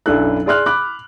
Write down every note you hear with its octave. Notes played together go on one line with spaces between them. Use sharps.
B1 F#2 D4 E4 A4 F#6
G#4 D5 C6 F6 F#6
B5 D6 F#6